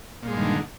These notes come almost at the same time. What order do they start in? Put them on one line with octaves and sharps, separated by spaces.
A#2 G#3 G2 D#3 D3